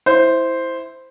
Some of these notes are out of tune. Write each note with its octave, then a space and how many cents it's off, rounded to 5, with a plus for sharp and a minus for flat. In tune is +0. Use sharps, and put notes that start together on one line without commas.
E4 -5 C5 -5